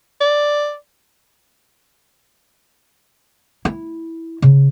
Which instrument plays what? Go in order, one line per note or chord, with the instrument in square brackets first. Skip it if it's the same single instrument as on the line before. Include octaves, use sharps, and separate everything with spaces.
[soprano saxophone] D5
[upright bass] E4
C#3